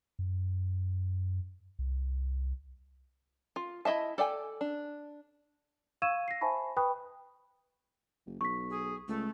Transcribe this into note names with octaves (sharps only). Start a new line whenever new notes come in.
F#2
C2
F4
E4 F4 D#5 E5 A5
A4 D5 G5 G#5
D4
F5 C#6 E6 G#6 D#7 E7
A#6 C7
C5 E5 G#5 A5 B5 C#6
B4 G5 B5 C#6 D#6 F#6
F#1
B1 C#6 B6
G#4
C#2 A3